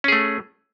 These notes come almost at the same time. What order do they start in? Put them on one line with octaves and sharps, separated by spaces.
C#4 G#4 A3